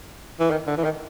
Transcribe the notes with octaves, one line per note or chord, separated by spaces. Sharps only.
E3
D#3
D3
E3
D#3